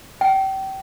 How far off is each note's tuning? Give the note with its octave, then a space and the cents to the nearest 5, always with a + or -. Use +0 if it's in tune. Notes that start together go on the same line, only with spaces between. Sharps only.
G5 -30